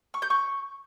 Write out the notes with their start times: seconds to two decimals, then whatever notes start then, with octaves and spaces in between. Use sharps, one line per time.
0.14 C#6
0.22 G6
0.30 C#6